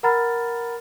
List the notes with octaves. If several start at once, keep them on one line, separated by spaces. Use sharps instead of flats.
A#4 F#5 A#5 B5 F6 A6